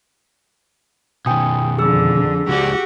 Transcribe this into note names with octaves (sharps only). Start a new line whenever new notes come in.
B2 D#3 G5 G#5 D#6
F2 D3 G#4 E6
C#2 F#4 G4 D5